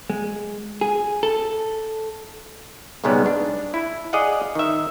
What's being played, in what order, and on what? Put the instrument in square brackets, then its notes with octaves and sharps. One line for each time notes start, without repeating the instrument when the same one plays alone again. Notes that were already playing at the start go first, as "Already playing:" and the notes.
[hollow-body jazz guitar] G#3
G#4
A4
[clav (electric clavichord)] B1 G#2 C#3 G3 G#3 B3
D4
E4
G#4 D5 D#5 F5 F#5
D#3 E5